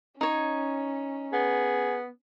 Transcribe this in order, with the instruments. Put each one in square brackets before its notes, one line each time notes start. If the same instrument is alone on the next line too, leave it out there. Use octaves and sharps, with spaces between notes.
[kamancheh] C#4 [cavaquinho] D#4 C#5
[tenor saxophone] B3 [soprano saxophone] G#4